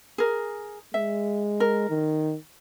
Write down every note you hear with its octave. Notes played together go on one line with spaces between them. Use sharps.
G#4 A#4
G#3 E5
A#4
D#3